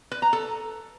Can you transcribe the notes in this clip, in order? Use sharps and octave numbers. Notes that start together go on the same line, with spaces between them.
B4
A#5
A4